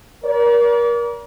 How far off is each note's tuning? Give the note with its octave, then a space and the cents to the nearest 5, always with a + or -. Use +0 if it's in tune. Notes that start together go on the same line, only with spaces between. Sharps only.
A#4 +35 D5 -35